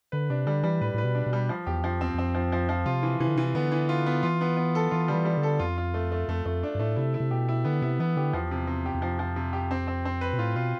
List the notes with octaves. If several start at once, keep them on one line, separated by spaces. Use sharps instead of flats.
D3 B4
C3 D4
D3 G3
E3 G3
A2 B4
A2 B4
B2
D4
B2
G3
F3
E2 G4
F2 F3
E2 C4
E2
F2 C4
F3
F3
F3
C3 F4
E3
C3 E3
D3
C3 E3
D3 B3
E3
F4
B3
E3 F4
B3
B3
A4
E3 F4
D3 G3
E3
G3
D3
A4
F2 F4
F4
A3
A3
F2 A3
F2 A3
D4
G2
A2 A3
C3 E4
E4
C3
B2 G4
E4
D3 B3
C3 E4
E3 B3
D3 G4
E2 F3
C3
C3
G4
E2
F2 F3
F3
C3
G4
C4
C4
C4
B4
B2
A2 F4
B2 F4